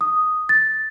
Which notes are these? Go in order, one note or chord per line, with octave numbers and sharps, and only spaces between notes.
D#6
A6